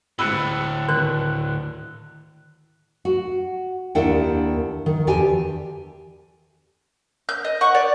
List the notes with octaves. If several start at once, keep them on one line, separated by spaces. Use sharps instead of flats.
D2 A2 B5 E6 F#6 C#7
D#3 F#6
F#4
D#2 A#3 D4 E4 F#5 G5
D#3
E2 D3 D4 G4 G#5
G6
D#5
F#5 C#6
D5